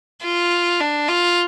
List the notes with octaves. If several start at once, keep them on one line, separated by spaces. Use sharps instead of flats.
F4
D4
F4